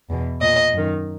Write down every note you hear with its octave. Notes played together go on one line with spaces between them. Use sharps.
E2 B2
A#2 D#5
F#2 D#3